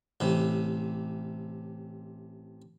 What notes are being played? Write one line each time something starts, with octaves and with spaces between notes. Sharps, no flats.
A1 C3